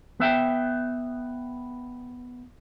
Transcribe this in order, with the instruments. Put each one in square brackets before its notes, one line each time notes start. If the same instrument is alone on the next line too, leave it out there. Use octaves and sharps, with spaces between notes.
[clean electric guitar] B3 E5 G5